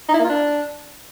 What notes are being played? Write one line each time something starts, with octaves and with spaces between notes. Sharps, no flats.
D#4
E4
A#3
F4
D4